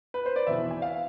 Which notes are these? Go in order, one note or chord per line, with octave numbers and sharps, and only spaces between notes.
B4
C5
D5
F1 E2 B2 E5
G#5
F5